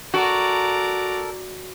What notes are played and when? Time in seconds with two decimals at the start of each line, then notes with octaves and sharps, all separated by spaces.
0.14 F#4 A4 A#4 D5 A#5